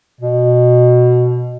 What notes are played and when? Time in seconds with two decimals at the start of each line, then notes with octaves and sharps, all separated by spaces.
0.21 B2